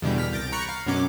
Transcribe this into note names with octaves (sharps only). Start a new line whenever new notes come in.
E2 B2 D3 G3 G6
F6 B6
C2 G6 A6 A#6 D7
A#5 B5 C#6 F#6 A#6 C#7
F5
F#2 B2 F#3 C#4 D6